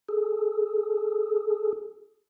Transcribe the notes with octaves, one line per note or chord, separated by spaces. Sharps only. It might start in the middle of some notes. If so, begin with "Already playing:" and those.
G#4 A4